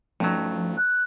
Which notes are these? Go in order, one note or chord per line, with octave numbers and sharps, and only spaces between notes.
G2 F3 F#3 A3 C#4 D#4
F#6